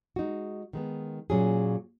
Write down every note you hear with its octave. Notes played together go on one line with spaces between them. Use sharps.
G#3 D#4 F#4
D#3 G#3 B3
A#2 F#3 C#4 G#4